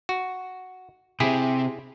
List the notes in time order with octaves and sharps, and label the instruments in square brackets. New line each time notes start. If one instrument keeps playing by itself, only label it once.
[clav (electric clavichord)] F#4
[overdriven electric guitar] C3 C4 [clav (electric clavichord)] E4 G4 G#4